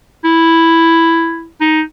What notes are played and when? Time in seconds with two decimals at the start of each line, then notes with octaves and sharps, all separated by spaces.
0.24 E4
1.61 D#4